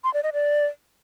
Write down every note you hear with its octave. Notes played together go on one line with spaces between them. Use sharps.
C6
D5
D#5
D5